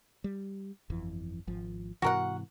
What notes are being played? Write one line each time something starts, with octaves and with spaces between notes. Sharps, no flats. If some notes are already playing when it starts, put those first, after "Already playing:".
G3
G1 F2 E3
G#1 F3
G#2 C3 E3 F#4 A#4 F#5